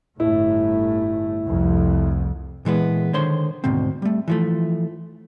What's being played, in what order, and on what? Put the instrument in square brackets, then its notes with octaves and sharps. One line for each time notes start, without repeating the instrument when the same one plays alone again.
[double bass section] G1 A2 A3 [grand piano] E4
[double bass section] F1 C2 F2
[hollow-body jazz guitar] A#2 E3 G#3 B3
D3 D#3 C5 C#5 C6
D2 G#2 B2 C4
G3 A3
E3 F3 A3